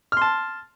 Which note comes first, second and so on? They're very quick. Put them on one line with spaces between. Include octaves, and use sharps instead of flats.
F6 C6 A5